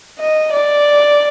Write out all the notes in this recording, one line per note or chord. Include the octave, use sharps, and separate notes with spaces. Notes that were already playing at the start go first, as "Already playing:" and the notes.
D#5
D5